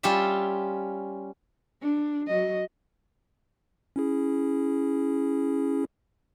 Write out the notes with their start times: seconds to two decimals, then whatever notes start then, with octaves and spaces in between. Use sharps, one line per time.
0.03 G3 C#4 F4 G4 E5
1.81 D4
2.27 F#3 D#5
3.96 C#4 E4 G#4